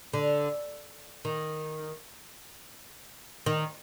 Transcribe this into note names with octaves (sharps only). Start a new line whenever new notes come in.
D3
D#3
D#3